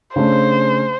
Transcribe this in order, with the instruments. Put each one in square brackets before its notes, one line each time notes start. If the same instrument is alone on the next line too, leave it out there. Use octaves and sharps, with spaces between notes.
[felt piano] C#3 A3 D4 [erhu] C5